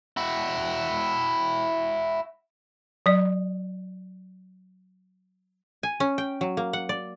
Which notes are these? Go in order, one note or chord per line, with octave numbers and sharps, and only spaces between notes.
E4 F#4
F#3 D5
G#5
C#4
G5
F#3
A#3
F#5
D5